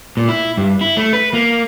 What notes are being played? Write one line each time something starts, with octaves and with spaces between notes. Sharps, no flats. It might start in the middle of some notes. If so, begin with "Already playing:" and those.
A#2
E4
G2
E4
A3
B4
A#3